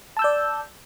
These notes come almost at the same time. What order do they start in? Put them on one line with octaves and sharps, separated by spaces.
A5 E6 G6 D5